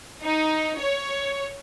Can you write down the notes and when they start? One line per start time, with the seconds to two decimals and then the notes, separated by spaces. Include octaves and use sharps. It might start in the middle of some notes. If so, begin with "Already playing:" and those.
0.23 D#4
0.79 C#5